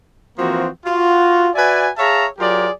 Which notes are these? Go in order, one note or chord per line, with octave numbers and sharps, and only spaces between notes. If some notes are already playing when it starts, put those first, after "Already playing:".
E3 F3 A#3 C4 F#4
F4 F#4
F#4 B4 D5 E5 G#5
G#4 C#5 E5 F5 A5 A#5
F#3 F4 G4 G#4 A#4 D5